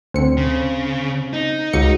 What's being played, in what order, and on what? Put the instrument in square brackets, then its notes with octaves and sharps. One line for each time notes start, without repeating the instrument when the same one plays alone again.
[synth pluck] D2 C#7 [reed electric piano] C4 C5
[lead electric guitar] C#3
D#4
[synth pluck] C#2 C#7 [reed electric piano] F#4